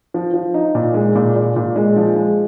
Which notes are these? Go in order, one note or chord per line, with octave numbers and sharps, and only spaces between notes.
F3
F3
D#4
A#2
G#3
A#2
A#2
A#2
G#3
F3
G#3